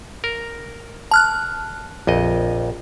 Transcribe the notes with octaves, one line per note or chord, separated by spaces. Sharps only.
A#4
A5 F6 F#6
A#1 F2 D#5